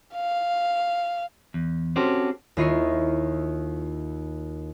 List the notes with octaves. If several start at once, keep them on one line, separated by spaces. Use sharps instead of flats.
F5
E2
C4 C#4 F#4 G4 A4 C5
D#2 E4 F4 D#5 C#6 C7